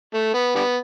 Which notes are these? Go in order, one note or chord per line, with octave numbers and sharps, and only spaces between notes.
A3
B3
D3 G3 B3